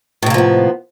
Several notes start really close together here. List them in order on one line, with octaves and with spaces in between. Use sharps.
A2 C3 A#3 F3 B3